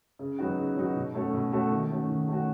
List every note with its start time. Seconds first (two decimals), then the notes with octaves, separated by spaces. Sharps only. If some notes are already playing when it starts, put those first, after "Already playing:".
0.19 C#3
0.39 F#3 B3 D#4 F#4
0.58 C#3
0.77 F#3 B3 D#4 F#4
0.96 B2
1.14 A3 C#4 F#4 A4
1.33 B2
1.53 A3 C#4 F#4 A4
1.71 D#3
1.90 A3 C#4 F#4
2.09 D#3
2.28 A3 C#4 F#4